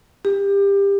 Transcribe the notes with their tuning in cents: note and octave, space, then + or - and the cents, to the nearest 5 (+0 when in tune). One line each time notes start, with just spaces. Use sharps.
G4 +25